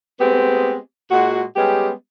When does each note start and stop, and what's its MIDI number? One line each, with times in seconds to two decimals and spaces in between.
0.20 0.77 56
0.20 0.77 57
0.20 0.77 59
0.20 0.77 60
0.20 0.77 67
1.11 1.42 46
1.11 1.42 56
1.11 1.42 66
1.56 1.90 55
1.56 1.90 56
1.56 1.90 59
1.56 1.90 61
1.56 1.90 67